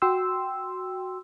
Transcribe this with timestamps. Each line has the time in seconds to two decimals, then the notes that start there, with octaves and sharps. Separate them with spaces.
0.02 F#4 G5 C6 E6